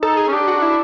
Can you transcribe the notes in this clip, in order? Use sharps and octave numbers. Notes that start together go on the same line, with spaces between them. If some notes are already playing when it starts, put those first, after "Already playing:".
D#4 A4
G#4
C#4
D4 G4
F#4
E4